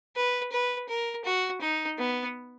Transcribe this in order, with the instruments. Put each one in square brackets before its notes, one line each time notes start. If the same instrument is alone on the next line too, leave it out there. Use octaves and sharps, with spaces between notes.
[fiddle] B4
B4
A#4
F#4
D#4
B3